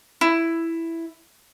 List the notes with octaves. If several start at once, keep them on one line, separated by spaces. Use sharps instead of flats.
E4